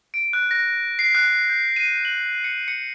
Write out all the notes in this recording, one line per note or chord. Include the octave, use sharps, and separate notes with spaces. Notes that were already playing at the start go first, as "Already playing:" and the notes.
D7
F#6
A#6
C7
F#6
G6
D#7
F#7
C#7
C#7